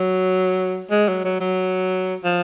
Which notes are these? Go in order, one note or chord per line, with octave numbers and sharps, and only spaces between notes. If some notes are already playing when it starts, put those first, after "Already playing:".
Already playing: F#3
G#3
F#3
F#3
F#3
F3